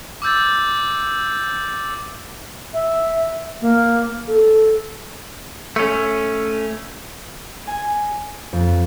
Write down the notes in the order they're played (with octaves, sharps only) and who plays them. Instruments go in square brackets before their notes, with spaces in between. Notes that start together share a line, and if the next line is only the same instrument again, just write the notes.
[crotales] D6 E6 G6 A6
[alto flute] E5
A#3
A4
[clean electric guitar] A3 C#4
[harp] G#5
F2